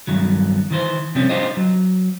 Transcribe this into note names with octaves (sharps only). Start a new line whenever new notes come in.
G2 D#3 F#3
D#3 E3 C5
C3 F3 G3 C4 C#4
D4 D#4 F4 G4 C5 D#5
F#3